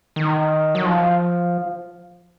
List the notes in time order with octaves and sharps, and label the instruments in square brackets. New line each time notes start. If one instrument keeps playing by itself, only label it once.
[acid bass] D#3
F#3
F3